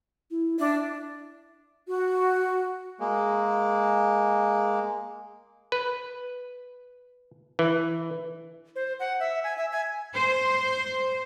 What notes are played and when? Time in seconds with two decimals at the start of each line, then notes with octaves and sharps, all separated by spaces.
0.31 E4
0.59 D4 E5
1.87 F#4
3.00 G#3 A#3
5.72 B4
7.59 E3
8.76 C5
9.00 F#5
9.20 E5
9.44 G#5
9.57 E5
9.72 G#5
10.14 C5